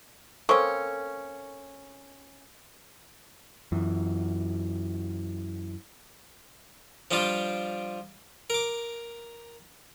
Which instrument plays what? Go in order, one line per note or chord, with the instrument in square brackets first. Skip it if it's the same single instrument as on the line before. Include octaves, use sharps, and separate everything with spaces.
[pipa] A#3 C4 C#4 [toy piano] A4 C#6
[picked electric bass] F#2 E3
[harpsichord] F3 G3 D4 F4
A#4 D6